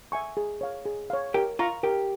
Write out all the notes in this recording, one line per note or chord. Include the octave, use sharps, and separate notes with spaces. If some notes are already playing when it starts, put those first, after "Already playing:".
E5 G#5 C#6
G#4
C#5 F5
G#4
C#5 F5
G4 A#4
F4 F5 A#5 C#6
G4 A#4